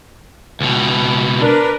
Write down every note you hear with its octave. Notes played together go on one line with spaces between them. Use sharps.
C#2 B2
D4 A#4 B4